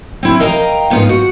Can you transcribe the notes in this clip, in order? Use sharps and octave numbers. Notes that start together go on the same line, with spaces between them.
C4 E4
A#4 D#5 F5 G5 G#5 A#5
G#2 B3 D#4 F4
F#4 F#5